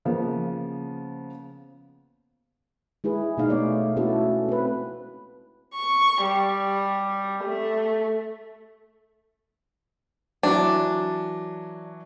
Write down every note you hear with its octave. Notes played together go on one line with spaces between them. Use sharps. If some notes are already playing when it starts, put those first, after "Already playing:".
C#3 F3 A#3 B3
G#3 E4 G#4 B4
B2 G#3 A3 D#4 F5
A3 B3 C#5 D5
A3 B3 C#4 E4 F#4 A4
C4 B4
C#6
G3
A3
E3 F#3 D4